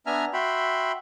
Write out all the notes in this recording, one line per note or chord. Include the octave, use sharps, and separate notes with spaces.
B3 D4 E5 G#5 A#5 F6
F#4 E5 G5 B5 C6